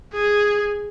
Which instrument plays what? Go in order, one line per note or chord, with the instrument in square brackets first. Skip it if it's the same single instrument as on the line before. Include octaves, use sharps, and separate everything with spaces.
[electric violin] G#4